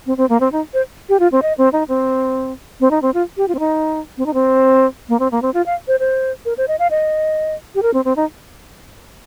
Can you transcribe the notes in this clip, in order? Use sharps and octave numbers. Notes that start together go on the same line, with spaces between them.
C4
C4
A#3
C4
D#4
C5
G4
F4
C4
D#5
C4
D#4
C4
C4
D#4
C4
F4
G4
F4
C4
D#4
C4
D#4
C4
A#3
C4
A#3
C4
F4
F5
C5
C5
A#4
C5
D#5
F5
D#5
G4
A#4
C4
C4
D#4